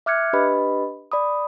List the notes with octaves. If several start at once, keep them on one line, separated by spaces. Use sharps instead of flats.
E5 D6 F6 F#6 G#6 C#7
D4 G4 B4 D#5 B5
D5 B5 D#6